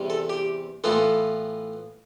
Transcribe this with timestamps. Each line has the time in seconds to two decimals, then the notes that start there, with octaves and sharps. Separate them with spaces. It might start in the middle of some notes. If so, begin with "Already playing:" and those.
Already playing: E2 C3 G3
0.10 A4
0.30 G4
0.84 A2 E3 B3 F4 A4